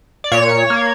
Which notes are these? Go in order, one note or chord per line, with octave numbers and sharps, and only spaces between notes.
D5
A#2 C#5
A#3